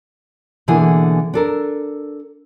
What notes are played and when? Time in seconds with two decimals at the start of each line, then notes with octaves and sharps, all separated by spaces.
0.68 B2 D3 E3 A#3 E4 G#4
1.33 D4 A4 A#4